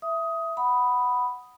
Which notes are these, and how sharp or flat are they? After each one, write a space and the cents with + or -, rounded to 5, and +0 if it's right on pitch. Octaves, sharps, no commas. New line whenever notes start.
E5 +10 D#6 +15
F#5 +0 B5 +0 D#6 +0